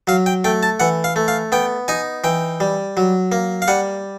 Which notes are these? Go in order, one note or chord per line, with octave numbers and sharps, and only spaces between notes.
F#3 F5
G5
A3 G5
A5
E3 F#5
F5
A3
F5
B3 G5
D#4 G#5
E3 G5
G3
F#3
A#3
F5
G3 F#5